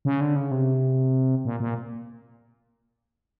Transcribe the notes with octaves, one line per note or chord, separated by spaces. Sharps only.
C#3
D3
C#3
C3
A#2
A#2